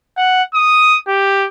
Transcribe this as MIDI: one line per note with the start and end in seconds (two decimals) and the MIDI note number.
0.17 0.42 78
0.54 0.98 87
1.08 1.48 67